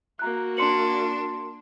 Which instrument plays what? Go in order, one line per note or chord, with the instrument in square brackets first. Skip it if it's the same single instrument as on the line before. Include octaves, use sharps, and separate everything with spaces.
[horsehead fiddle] A#3 F#4 [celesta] A#5 F#6
[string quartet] D4 [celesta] C6 C#7 F#7